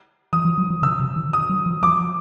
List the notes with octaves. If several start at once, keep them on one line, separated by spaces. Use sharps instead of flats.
E3 D#6
F3
F#3
F3
C#3 E6
C3
D#3
D#6
F#3
F3
F3 D6